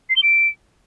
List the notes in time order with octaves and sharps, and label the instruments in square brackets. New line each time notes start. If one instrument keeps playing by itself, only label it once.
[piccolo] C7
G7
D7